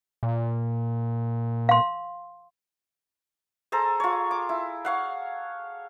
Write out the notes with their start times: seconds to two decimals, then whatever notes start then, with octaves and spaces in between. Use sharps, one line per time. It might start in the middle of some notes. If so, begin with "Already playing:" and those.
0.23 A#2
1.69 F5 C6
3.72 G#4 A4 C5 A#5
4.00 F4 C#5
4.31 D6
4.49 E4
4.85 C#5 F5 F#5